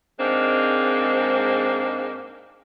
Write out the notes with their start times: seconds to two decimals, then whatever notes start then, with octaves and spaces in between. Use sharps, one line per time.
0.19 G#2 G#3 A#3 C4 D4